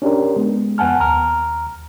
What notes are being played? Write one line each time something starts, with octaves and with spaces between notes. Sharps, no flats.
C#4 D4 G4 A#4
G#3 B3
F2 B3 F#5 G#5 A5 F6
D#2 A#5 F6